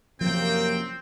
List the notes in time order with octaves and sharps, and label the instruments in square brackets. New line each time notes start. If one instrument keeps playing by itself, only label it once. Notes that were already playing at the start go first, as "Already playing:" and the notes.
[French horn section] F#2 C3 A#3 [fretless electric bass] F3 [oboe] C4 [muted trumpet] G5